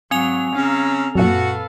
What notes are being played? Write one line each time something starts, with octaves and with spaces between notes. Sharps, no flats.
G#2 F#3 C4 G#5 F7
C#3 C#4 F5 A#5 E6
F#2 A#2 F#4 A4 B4 F5